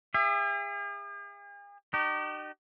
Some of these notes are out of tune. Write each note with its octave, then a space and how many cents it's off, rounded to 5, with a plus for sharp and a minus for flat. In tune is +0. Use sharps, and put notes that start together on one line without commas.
G#4 -45 E5 +25
D#4 -40 G4 -35